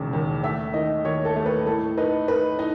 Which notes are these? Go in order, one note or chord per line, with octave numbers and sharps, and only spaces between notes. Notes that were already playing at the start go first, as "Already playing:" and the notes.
Already playing: E1 D#2 C#3
D#2
A3 E5
D#3 D#5
D#2 C#5
A4
A3
B4
A2 A4
D#4 B4
D#4 B4
D#4 D#5